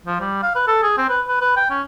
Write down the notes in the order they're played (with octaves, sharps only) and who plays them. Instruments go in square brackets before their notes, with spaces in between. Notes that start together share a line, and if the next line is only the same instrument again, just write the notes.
[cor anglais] F3
G3
F5
B4
A4
G#4
C4
B4
B4
B4
G5
C#4